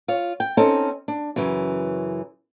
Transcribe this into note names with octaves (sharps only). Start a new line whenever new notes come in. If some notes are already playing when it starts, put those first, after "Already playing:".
F4 C#5
G5
C4 C#4 D#4 A4
D4
F#2 C#3 E3